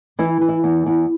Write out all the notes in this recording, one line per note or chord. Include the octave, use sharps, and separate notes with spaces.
E3 E4
E3
E4
E2
E2